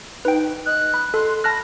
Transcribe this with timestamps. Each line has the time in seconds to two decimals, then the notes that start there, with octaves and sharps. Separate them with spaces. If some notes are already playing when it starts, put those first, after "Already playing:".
0.25 D#4 B4 G5
0.66 D#5 F#6
0.94 B5
1.14 A4 C6
1.44 A5 B5 F6 F#6 A#6